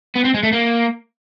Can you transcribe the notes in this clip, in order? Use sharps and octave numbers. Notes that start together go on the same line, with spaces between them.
B3
C4
G#3
A3
A#3